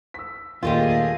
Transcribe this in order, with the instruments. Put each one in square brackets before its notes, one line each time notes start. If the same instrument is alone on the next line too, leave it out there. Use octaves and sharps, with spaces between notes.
[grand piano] E6 B6
[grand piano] D#2 [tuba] A#2 [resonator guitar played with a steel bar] G3 A3 F4 [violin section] G#4 D#5